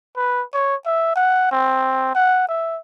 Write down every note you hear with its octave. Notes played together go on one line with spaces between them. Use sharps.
B4
C#5
E5
F#5
C4
F#5
E5